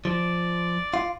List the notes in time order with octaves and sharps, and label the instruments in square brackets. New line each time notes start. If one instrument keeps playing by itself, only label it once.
[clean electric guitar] F3 [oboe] D5
[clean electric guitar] F4